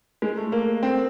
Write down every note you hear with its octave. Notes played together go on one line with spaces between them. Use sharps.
G#3
A3
A#3
C4